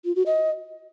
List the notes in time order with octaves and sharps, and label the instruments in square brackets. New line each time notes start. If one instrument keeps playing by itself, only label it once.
[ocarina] F4
F#4
D#5